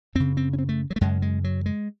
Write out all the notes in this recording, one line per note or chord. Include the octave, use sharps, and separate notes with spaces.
F#2 C#3 C4
C4
C#4
C4
A3
F#3
A3
F#2 C#3 G#3
G#3
F#3
G#3